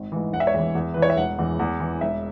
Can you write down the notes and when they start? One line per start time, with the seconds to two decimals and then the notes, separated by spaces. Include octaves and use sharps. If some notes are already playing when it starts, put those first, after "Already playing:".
Already playing: G#1
0.12 G#2 E3
0.33 E1 F#5
0.40 E5
0.47 C#5
0.54 E2 E3 E5
0.75 E2
0.94 E3 B4
1.02 C#5
1.10 E5
1.17 E1 F#5
1.38 E2 E3
1.59 E2
1.80 E3
2.01 E1 E5